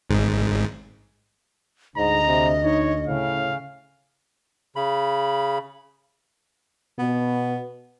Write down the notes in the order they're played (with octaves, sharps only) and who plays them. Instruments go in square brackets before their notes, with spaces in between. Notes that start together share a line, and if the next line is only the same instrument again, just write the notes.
[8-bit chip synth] G#1 G#2
[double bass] D2 [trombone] G#2 [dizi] D#5 [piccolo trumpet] A#5
[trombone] C3
[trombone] D#4 [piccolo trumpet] C#5
[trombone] A2 [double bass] C#3 [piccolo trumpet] F5
[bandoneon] C#3 B5
[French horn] B2 [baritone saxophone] B3